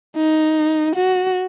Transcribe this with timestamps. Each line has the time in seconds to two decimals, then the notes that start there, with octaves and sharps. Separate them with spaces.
0.16 D#4
0.95 F#4